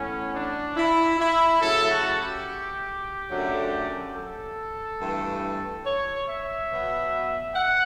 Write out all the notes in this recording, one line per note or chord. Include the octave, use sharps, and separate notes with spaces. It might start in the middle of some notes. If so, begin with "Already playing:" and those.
Already playing: A2 E3 B3 C#4
D4
E4
E4
C#3 F#3 A3 A4
F#4
G4
F#2 D3 F#3 A3
A4
G2 E3 A3
C#5
E5
B2 F#3 B3
F#5